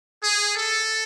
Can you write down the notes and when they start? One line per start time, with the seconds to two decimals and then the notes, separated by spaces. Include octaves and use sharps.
0.23 G#4
0.56 A4